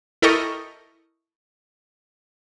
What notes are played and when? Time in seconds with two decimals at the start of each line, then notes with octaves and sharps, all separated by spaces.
0.22 E4 A4 A#4 D#5 G5 C#6